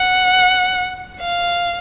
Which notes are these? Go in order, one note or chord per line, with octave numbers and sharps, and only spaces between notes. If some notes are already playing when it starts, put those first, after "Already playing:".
Already playing: F#5
F5